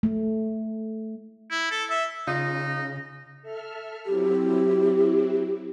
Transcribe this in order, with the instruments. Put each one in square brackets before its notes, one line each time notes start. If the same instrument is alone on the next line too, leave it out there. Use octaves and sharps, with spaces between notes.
[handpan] A3
[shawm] E4
A4
E5
[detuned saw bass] C#3 [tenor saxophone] D#4 [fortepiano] F4 [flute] A#6
[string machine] A4 E5 F6
[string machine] F#3 C4 E4 [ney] G4